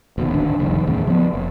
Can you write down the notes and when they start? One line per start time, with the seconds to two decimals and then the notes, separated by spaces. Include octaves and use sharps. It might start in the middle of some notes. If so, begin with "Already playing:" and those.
0.18 D#1 B2 D#3
0.32 D1 G#1 D3 D4
0.59 F#1 C2 F2 D#3
0.87 E2 A2 C#3
1.07 F3 B3
1.33 F#1